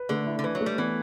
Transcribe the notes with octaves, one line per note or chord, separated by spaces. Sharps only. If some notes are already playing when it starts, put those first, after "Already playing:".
Already playing: B4
D3 A3
E4
D3
E3 B4
F#3
A3
G3
E3 B3